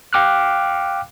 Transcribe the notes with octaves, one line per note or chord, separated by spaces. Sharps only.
F5 G5 D6 F6 F#6